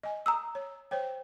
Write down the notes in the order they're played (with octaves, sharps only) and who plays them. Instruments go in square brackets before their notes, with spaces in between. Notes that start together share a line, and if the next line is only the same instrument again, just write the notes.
[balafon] D#5 G#5
[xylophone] A#5 D#6 E6
[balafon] C#5
C5 C#5 G5